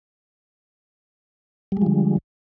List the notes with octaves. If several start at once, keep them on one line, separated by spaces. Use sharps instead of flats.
D3 F3 G3 G#3